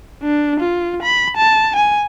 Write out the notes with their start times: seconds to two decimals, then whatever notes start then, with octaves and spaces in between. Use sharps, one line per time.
0.23 D4
0.60 F4
1.03 B5
1.37 A5
1.76 G#5